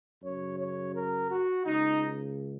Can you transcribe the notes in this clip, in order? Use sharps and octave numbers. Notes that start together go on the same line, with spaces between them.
F#2 C#3 C#5
C#5
A#4
F#4
C#2 C#3 D#4